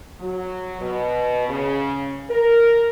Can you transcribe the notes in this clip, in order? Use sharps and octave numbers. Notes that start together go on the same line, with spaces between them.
F#3
B2
C#3
A#4